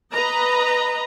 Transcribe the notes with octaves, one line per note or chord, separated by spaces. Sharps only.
B4 D#5 A#5